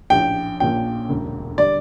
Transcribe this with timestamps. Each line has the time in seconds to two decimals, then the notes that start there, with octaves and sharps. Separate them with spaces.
0.10 A#1 A2 F3 C#4 G4 G5
0.60 A#1 A#2 F3 A#3 C#4 G5
1.09 E1 D2 C#3
1.58 D3 G3 D5